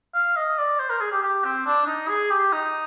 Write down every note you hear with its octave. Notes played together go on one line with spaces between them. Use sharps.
F5
D#5
D5
C5
A#4
G#4
G4
G4
C4
D4
D#4
G#4
G4
D#4